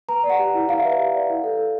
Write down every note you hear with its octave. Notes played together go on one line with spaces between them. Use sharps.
B4 A#5
D5
F#5
G4
E4
E4 F5
E5
B4 F5
G4
D5
E4
A4
A4